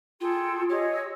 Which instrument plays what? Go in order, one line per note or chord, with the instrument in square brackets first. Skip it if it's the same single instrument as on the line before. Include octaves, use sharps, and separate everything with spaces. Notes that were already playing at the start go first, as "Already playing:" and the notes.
[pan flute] F4 [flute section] G#4 A4 G5
[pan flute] G4 [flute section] G#4 C#5 D#5
[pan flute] E6